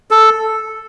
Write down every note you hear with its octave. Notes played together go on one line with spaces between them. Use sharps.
A4